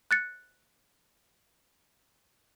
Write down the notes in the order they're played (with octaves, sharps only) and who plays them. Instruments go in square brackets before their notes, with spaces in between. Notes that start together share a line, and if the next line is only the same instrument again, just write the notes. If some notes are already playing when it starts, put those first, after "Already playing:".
[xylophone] F#6 A6 C#7